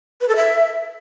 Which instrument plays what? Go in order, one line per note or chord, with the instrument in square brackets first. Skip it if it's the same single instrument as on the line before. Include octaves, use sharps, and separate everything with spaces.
[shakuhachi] B4
A4
E5